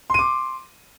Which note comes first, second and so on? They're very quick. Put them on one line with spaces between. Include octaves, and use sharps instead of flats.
C6 D#7 D6